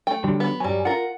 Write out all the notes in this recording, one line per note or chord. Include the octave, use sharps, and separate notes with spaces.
A3 G5
D3 F#3 G3
B3
G2 F#3 G3 G#5
F4 A#4 F#5